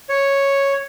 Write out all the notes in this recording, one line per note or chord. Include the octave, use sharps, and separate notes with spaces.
C#5